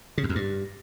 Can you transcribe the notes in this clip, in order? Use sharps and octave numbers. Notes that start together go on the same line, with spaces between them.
C#3
F#2
F2
G2